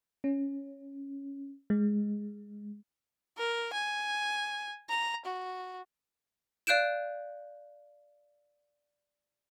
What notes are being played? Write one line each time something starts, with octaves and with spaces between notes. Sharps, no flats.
C#4
G#3
A#4
G#5
A#5
F#4
D5 F5 F#6 G6 D7 E7